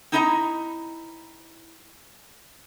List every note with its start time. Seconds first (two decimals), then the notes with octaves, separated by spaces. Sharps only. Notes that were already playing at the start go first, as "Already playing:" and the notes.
0.12 C4 D#4 E4 D#5 E5 A#5